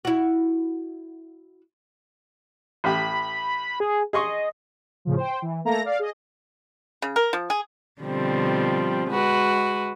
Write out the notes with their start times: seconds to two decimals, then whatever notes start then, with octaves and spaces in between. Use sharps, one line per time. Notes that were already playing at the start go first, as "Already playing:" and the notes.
0.05 E4 F#4
2.84 A1 G4 B5
3.80 G#4
4.13 G#4 D#5 C6 C#6
5.05 A2 C#3 F3
5.16 C5 G5
5.42 E3
5.65 A3 A#3 A4 A#5 A#6
5.84 D5 F5
5.99 G#4 D#5
7.02 C#3
7.16 A#4
7.33 F3
7.50 G#4
8.01 B2 D3 F3 G3 C4
9.10 G#3 F#4 B4